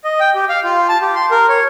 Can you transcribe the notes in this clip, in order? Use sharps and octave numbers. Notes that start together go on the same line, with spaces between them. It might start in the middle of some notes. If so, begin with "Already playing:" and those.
D#5
G5
G4
F5
F4
A5
G4
C6
A#4
C#5